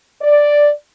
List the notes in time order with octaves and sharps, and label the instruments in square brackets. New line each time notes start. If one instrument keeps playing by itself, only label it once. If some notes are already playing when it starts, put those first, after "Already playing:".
[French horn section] D5